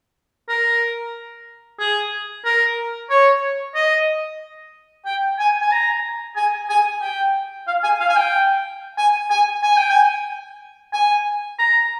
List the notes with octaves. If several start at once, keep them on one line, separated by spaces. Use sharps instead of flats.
A#4
G#4
A#4
C#5
D#5
G5
G#5
G#5
A#5
G#5
G#5
G5
F5
G#5
F5
G#5
G5
G#5
G#5
G#5
G5
G#5
G#5
A#5